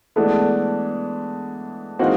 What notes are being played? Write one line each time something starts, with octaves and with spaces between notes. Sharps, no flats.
E3 G#3 A3 B3 D4
E3 G#3 A#3 C4 D#4 F#4